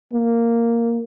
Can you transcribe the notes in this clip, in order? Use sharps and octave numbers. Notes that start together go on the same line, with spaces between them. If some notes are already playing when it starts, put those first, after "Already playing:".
A#3